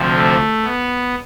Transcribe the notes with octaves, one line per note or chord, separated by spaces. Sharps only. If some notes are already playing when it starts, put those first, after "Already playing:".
Already playing: D2 C3 F3
A3
B3